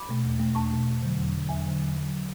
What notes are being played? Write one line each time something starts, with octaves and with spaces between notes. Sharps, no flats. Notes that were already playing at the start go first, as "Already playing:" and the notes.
Already playing: B5 D6
B2 A3
E2
B2 A3
E2 A5 C#6
B2 A3
E2
D3 F#3
E2
D3 F#3
E2 E5 G#5
D3 F#3
E2
D3 F#3